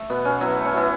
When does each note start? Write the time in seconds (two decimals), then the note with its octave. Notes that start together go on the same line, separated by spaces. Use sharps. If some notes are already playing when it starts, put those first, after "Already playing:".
Already playing: A3
0.10 B2 B3
0.25 B2 C#4
0.41 F#3 B3 E4
0.57 A3
0.65 C#4
0.73 B2 B3 E4